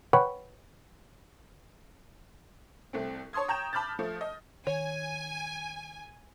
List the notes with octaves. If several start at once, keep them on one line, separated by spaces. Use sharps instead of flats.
B4 C#5 F#5 G5 B5 C#6
C2 A3 C4
C#5 A5 C6 D#6 G#6
G5 A#5 C#6 G6 E7
A5 B5 D6 F6 G6 A6
F3 A3
D#5
D#3 C#5 G#5